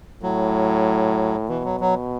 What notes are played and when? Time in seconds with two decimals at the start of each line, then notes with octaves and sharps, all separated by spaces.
0.22 A2 F#3
1.49 B2 E3
1.65 F#3
1.80 F#3